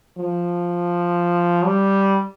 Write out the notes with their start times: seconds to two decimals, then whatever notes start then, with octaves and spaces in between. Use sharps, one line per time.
0.19 F3
1.65 G3